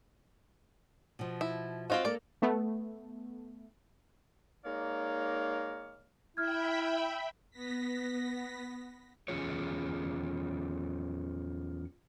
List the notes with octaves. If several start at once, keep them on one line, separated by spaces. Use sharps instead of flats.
B2 F3
E4
C4 F4 F#4 C5 D#5 F5
A#3 A4 A#4 D5
A3 B3
G#3 A#3 D#4 C#5 D5 F5
E4 E5 G5 B5 F6 G#6
B3 A#6 B6
E2 C#4 F4 G#4 C#5